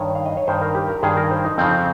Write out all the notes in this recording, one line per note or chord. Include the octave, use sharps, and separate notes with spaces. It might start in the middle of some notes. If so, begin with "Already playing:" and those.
Already playing: G2 D#3 C#5
F5
D#5
C#5
G2 D#3 C5
A#4
G4
A#4
G2 D#3 G#4
A#4
C5
D#4
F2 C#3 F3 C4